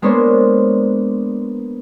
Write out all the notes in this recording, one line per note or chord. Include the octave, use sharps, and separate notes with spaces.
G#3 A#3 B3 D4 C5 C#5